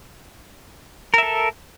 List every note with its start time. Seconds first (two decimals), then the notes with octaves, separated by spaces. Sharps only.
1.14 A#4
1.18 E5
1.23 A4